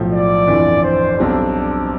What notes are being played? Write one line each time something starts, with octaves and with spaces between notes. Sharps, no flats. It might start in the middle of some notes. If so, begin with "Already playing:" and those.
Already playing: B1 A2 F3
D5
G1 F2 E3
C5
B1 B2 G3 C4 D4